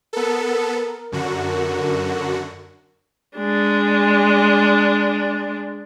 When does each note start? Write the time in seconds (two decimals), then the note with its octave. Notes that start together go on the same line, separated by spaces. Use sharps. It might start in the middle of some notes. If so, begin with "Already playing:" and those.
0.13 B3 A4 A#4
1.12 F#2 D3 F#4
3.38 G#3 D4